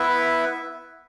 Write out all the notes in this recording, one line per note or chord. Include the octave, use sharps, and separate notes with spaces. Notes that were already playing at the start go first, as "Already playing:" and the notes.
Already playing: B3 E4 B4 E5